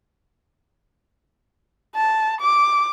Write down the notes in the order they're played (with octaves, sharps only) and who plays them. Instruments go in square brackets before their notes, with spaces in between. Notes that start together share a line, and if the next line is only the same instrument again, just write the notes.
[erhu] A5
D6